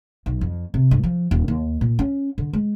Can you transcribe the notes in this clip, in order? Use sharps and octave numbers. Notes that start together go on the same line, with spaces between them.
B1
F2
C3
G2
F3
D#1
D#2
A#2
C#4
D3
G#3